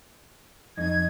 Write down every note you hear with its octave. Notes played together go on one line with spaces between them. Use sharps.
F2 D#4 G#6